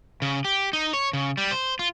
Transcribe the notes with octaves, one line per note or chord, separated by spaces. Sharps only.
C#3
G4
D#4
C#5
C#3
G3
C5
F4